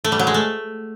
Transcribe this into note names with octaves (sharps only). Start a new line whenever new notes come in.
A3
G3
F#3
G#3
A3